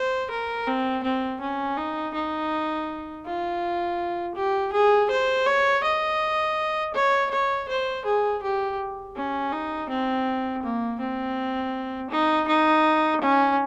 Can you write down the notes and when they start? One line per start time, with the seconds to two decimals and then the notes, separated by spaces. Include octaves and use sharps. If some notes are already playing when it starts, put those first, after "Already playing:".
Already playing: C5
0.30 A#4
0.67 C4
1.04 C4
1.41 C#4
1.78 D#4
2.14 D#4
3.26 F4
4.35 G4
4.73 G#4
5.10 C5
5.47 C#5
5.84 D#5
6.94 C#5
7.31 C#5
7.69 C5
8.05 G#4
8.42 G4
9.15 C#4
9.52 D#4
9.89 C4
10.63 A#3
11.00 C4
12.10 D#4
12.48 D#4
13.21 C#4